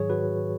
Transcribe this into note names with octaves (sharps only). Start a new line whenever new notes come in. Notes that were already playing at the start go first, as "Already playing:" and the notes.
Already playing: G#2 D#3 F#3 G#4 C#5
F#4 B4